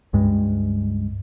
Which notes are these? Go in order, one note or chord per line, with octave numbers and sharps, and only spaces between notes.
C#2 G2 G#3